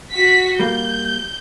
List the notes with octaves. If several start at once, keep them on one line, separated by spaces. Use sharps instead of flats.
F#4 B6
G3 A#3 G6